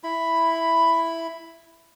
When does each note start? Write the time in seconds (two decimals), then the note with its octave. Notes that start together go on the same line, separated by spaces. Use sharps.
0.03 E4 B5